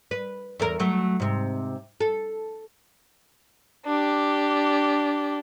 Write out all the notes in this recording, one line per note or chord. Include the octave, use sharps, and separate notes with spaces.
B4
E2 A4 A#4
F#3 A3
G#2 C3
A4
D4 G4